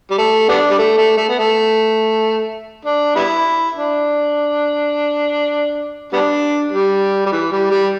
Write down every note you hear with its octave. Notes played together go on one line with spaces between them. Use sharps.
G3
A3
G3 B3 D4
G3
A3
A3
A3
B3
A3
D4
G3 B3 E4
D4
G3 B3 D4
G3
G3
E3
G3
G3